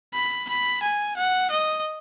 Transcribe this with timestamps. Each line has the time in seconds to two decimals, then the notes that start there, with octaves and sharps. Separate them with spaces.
0.14 B5
0.49 B5
0.83 G#5
1.17 F#5
1.51 D#5